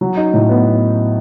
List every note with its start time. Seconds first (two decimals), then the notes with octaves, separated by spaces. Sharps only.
0.01 F#3
0.17 D#4
0.34 A2
0.49 B3